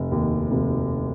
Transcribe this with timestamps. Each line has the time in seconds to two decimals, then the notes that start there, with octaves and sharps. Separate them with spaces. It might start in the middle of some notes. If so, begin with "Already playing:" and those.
Already playing: F1
0.12 D#2
0.51 F1